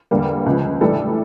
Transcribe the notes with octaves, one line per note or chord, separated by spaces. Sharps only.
E2 D3 G3 A#3
C#2 C#3 F3
A2 E3 G3 D4 A4